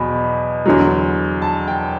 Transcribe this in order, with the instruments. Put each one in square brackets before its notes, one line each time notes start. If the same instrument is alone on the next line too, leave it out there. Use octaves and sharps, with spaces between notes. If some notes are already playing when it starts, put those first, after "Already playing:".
Already playing: [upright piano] E2 B2 F#3 B5
E2 D3 F#3
A5
G5